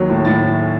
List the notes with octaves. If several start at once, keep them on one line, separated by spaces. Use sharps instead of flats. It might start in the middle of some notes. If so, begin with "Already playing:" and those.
Already playing: D#2 F#3
A2
A2 A6